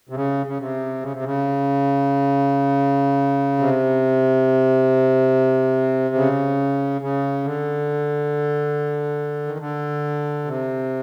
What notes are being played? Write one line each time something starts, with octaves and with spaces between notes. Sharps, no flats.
C3
C#3
C#3
C3
C#3
C3
C#3
C3
C#3
C#3
D3
D#3
D3
C3